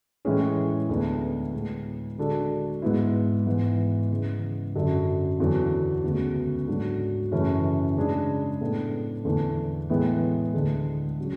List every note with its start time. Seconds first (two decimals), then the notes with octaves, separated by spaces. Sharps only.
0.25 A2 E3 G#3 C#4 G#4
0.89 D2 D3 G#3 B3
1.54 A2 G#3 B3
2.18 D3 G#3 D4 F#4 A4
2.82 G#2 G#3 B3 E4
3.47 G#2 E3 B3
4.11 C#3 E3 G#3
4.76 F#2 D3 F#3
5.40 E2 D3 F#3
6.04 D2 C#3 G#3 B3 F#4
6.68 G#2 F#3 A3 D4 F#4
7.32 F#2 C#3 E3 A3 C#4
7.97 C#3 G#3 D4 G#4
8.60 A2 G#3 B3 D4 A4
9.25 E2 D3 A3 E4
9.90 A2 E3 G#3 B3
10.54 D2 D3 G#3
11.20 C#3 F#3